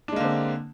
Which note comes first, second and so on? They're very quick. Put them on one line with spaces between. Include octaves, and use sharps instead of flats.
D4 G#3 A#3 D3 C4